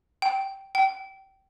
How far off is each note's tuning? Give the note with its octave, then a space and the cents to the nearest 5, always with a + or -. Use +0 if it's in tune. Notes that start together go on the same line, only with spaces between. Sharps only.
G5 -10
G5 -25